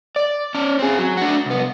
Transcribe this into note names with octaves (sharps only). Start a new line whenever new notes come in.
D5
C#4 D5
C4 G#4
F#3
D4 F#4
C2 B3